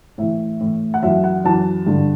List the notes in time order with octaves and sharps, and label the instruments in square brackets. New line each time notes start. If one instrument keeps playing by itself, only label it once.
[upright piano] A2 E3 E5
A2 E3
F#5
F#2 E3 E5
F#5
F#2 E3 A5
G2 D3